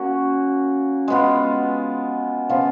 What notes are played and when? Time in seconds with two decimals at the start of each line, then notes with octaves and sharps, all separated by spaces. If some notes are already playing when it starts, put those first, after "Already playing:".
Already playing: A#3 C#4 F#4
1.08 G#3 B3 F4
2.49 C#3 F3 B3 F4